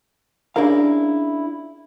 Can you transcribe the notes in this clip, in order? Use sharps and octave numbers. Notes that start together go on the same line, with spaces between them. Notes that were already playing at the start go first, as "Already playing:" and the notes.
C#4 D4 E4 G#4 A#4 F5